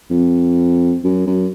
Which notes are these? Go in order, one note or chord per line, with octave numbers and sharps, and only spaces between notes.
F2
F#2
F#2